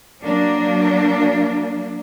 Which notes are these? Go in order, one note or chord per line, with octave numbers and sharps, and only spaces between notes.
F#3 A#3 D4